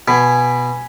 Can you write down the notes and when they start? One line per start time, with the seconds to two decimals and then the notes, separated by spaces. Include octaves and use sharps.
0.08 B2 G#5 B5